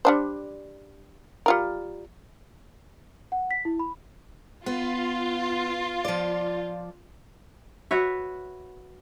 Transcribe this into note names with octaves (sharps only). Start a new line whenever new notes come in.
G3 D4 C5
G3 F4 A#4
F#5
B6
E4
B5
B3 F4
F3 D5
F#4 B4 C#5 E5